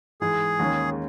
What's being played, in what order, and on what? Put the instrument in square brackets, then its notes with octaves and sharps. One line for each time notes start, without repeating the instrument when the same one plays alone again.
[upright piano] G#2 E3 G#3 [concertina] G#4
[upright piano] D#2 D#3 G#3 C#4